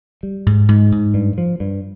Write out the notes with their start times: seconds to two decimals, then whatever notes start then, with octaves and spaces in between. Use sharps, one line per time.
0.23 G3
0.46 G#2
0.68 G#2
0.92 G#2
1.14 G2
1.38 F3
1.60 G2